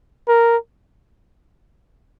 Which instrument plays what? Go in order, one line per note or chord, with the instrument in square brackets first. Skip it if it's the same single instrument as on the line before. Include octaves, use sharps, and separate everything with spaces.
[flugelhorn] A#4